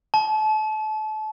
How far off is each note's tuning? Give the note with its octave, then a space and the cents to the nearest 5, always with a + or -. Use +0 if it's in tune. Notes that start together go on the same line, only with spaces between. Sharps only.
A5 -30